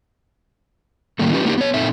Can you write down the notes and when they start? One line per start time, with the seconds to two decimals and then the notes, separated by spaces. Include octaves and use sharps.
1.19 A2 D#3 G3 A#3 A4
1.33 C#4 D#4 F4 G4 B4
1.45 A#3 C#4 D#4 E4 G4
1.58 B3 C#5
1.74 A#2 C4 D#4 A4 E5